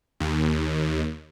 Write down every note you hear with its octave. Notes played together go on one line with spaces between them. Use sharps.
D#2